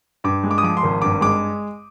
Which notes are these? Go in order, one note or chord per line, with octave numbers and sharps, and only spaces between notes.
G2 D6
G#3
D6
D#6
F3 D6
C6
G#1
G2 D6
G#3 D6